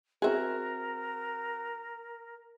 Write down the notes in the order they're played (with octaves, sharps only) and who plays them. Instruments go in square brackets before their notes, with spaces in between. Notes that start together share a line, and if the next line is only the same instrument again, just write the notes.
[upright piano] C4 F#4 [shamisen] G#4 E5 [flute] A#4